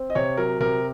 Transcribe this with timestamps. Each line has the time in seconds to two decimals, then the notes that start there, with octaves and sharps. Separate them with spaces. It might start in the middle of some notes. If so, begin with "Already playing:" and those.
Already playing: C4
0.10 D#5
0.15 C3 C#5
0.37 F#3 A#4
0.60 C3 A#4